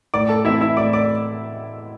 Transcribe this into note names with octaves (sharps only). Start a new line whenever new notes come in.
A2 D5 D6
A4 A5
E3 C4 E4 E5
E4 E5
A2 D5 D6
D5 D6